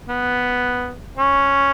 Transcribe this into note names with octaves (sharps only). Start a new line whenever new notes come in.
B3
C#4